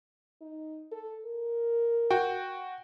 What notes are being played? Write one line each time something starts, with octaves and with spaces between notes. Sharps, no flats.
D#4
A4
A#4
F#4 G5